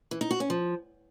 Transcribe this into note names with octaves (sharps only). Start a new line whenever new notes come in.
E3
D#4
F#4
C#4
F3